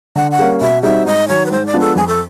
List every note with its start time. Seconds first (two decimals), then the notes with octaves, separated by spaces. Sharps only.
0.16 D3 F#5
0.31 F#5
0.38 G3 A#3 C#4
0.61 B2 E5
0.83 G3 C4 D#4 F#4 E5
1.06 G#2 D#5
1.28 D#3 F#3 C#5
1.46 B4
1.51 G#2 C5
1.66 D5
1.73 F3 G#3 B3 D4
1.80 A4
1.96 F2 G#4
2.07 A4